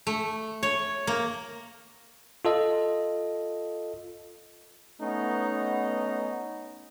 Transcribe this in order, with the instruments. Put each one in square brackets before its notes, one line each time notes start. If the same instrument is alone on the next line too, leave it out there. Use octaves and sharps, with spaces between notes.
[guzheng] A3
C#5
A#3
[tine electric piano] F4 A4 D#5
[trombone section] A3 B3 C#4 D#4